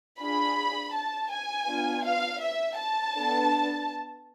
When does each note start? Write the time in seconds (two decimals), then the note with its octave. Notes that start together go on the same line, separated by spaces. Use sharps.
0.20 D4 F4 G#4 B5
0.93 A5
1.31 G#5
1.67 B3 D4 F4
2.05 F5
2.41 E5
2.77 A5
3.14 B3 D4 A4